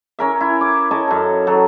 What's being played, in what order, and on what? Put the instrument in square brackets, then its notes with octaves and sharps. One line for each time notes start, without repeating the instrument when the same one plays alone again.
[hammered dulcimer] C#4 A#4 E5
E4
D6
C#5 D#5 G#5 A5
F#2 A4
F#3 A4